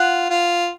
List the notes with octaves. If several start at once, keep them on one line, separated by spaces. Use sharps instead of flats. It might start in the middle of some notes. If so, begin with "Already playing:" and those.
Already playing: F4 F#5
F4